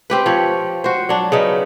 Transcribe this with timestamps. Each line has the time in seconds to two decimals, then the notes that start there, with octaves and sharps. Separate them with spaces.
0.10 C4 G4 B4
0.26 F3 C#5
0.84 F#4 C5
1.09 F#3 D4
1.32 C#3 B3 D#4